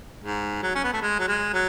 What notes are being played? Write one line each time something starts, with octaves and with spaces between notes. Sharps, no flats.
G#2
F#3
C#4
B3
A3
G#3
F#3
G#3
F#3